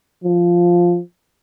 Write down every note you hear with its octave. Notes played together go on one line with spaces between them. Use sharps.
F3